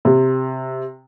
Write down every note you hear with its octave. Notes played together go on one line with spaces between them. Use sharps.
C3